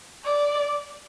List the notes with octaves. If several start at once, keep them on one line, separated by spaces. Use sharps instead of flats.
D5